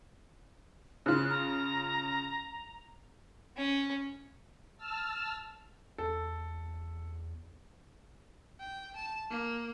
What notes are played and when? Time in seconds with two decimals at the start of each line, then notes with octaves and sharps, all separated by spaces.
1.06 C#3 F4 F#6
1.30 A#5
3.57 C#4
4.77 A5 E6 F6
5.98 E2 A4
8.60 G5
8.96 A5
9.31 A#3